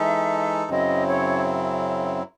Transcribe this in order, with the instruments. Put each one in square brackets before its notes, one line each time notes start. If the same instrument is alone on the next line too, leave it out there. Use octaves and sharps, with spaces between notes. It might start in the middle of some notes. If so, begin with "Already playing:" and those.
Already playing: [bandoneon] E3 G#3 D#4 A4 [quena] E5
[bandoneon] F#2 C#3 F#3 C4 E4 [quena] D#5
[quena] C#5